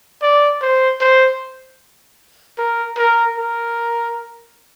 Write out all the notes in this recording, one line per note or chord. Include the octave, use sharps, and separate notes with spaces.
D5
C5
C5
A#4
A#4
A#4